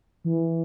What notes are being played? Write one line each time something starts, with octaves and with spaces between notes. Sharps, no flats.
E3